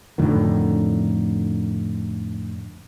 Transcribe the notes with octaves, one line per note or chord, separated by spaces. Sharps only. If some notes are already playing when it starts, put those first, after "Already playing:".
F2 A2 D3 D#3